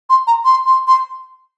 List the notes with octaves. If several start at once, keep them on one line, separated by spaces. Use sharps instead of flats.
C6
A#5
C6
C6
C6